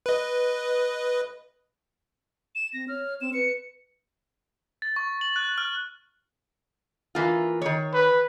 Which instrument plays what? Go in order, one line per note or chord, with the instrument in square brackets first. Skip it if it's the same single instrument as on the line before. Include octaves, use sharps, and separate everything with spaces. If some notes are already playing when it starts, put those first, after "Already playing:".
[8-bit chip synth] B4 D#5
[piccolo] E7
[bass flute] C4 [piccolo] A#6
[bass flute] C#5 [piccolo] F6
[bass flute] C4 [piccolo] E7
[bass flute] B4 [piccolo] C#7
[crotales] A6
C#6
F#7
F#6
F6
[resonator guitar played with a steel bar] E3 A#3 F4
D#3 C#5
[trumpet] B4